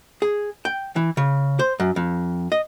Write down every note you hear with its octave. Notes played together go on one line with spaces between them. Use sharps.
G#4
G5
E3
C#3
C5
F#2
F2
D#5